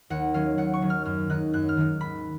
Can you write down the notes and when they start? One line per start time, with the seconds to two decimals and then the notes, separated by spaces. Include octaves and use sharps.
0.10 D#2 F#5
0.34 D#3 F#3 C#4 F5
0.58 D#2 F#5
0.74 C#6
0.82 D#3 F#3 C#4
0.90 F6
1.05 F#2 F6
1.29 D#3 G#3 D#4 F#6
1.53 F#2 F#6
1.69 F6
1.77 D#3 G#3 D#4
2.01 G#1 B5